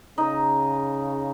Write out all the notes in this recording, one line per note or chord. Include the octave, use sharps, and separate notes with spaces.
C#3 D#4